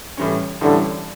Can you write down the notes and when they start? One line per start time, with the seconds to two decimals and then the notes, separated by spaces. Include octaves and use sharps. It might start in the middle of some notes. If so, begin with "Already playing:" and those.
0.17 A2 E3 G3 C#4
0.61 A2 D3 E3 G3 C#4